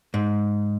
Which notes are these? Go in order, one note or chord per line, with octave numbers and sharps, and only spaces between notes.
G#2